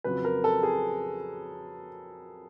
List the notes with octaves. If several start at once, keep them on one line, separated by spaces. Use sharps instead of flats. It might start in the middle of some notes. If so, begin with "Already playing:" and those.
F2 C#3 F#3 B4
A#4
A4
G#4